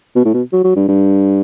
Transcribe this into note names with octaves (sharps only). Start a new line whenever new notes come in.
B2
A2
B2
F#3
F#3
G2
G2